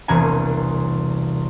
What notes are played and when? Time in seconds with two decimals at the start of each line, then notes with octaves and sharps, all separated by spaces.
0.08 E1 C2 C3 A#3 G#5